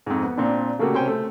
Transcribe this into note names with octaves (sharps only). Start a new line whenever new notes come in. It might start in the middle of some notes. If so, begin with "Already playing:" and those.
F2 G#2
B3
A#2 C4 D4
C#3 A3 A#3 F#4 G4
C3 C#4 C5 G5 G#5
A3